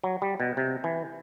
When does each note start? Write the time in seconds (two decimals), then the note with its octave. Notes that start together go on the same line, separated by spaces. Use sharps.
0.04 F#3
0.22 G3
0.40 B2
0.57 C3
0.84 E3